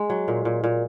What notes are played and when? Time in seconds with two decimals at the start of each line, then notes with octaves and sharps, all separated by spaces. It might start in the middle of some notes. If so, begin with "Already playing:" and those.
Already playing: G#3
0.10 F#3
0.28 A#2
0.45 A#2
0.64 A#2